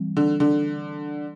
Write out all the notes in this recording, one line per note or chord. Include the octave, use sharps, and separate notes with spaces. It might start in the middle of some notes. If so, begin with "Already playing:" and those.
Already playing: E3 G3 C4
D3
D3